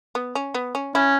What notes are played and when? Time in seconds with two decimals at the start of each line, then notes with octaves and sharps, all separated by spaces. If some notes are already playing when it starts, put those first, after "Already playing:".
0.15 B3
0.35 C#4
0.54 B3
0.75 C#4
0.95 C#4 E4